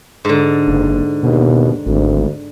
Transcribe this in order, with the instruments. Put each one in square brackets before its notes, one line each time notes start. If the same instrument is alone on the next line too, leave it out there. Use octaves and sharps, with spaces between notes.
[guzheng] G#2 D3
[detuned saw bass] F#1
[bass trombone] D#2 [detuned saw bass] B2
[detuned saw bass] G#1 [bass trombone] D2